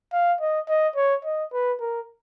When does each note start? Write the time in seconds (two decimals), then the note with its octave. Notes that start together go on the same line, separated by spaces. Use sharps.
0.13 F5
0.40 D#5
0.69 D#5
0.96 C#5
1.25 D#5
1.53 B4
1.80 A#4